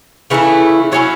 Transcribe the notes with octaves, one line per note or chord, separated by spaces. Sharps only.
C#3 E3 A3 E4
F#3 C#4 E4 C#5